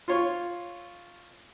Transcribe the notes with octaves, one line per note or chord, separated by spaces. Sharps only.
F4 C#5